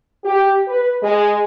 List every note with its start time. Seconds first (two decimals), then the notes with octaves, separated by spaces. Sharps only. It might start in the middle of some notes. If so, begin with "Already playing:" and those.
0.25 G4
0.67 B4
1.03 G#3